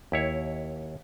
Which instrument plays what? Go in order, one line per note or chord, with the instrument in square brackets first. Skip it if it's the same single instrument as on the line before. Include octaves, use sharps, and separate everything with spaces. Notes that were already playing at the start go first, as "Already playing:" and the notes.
[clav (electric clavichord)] D#2 E4 C#5